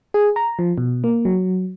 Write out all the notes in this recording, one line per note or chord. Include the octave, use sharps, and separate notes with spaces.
G#4
A#5
F3
B2
A#3
F#3